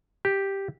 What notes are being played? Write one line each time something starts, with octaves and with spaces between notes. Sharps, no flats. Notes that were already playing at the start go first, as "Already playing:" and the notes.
G4